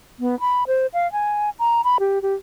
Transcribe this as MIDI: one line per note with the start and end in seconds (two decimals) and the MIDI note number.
0.20 0.39 59
0.40 0.64 83
0.67 0.87 72
0.93 1.10 77
1.12 1.50 80
1.59 1.82 82
1.84 1.98 83
2.00 2.22 67
2.22 2.34 67